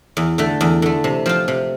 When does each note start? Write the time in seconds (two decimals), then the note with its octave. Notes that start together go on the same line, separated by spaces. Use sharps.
0.17 E2
0.38 D3 A3
0.61 E2
0.82 D3 A3
1.04 C3
1.26 F3 C4 F4
1.48 C3